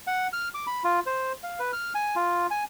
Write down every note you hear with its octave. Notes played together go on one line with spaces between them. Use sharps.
F#5
F6
D6
B5
F4
C5
F5
B4
F6
G#5
F4
G#5